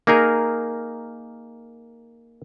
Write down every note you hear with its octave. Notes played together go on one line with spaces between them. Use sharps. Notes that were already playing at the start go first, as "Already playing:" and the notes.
A#3 D#4 G#4 A#4